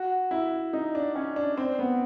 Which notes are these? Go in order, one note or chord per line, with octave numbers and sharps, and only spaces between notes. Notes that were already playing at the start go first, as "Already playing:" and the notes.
Already playing: F#4
E4
D#4
D4
C#4
D4
C4
B3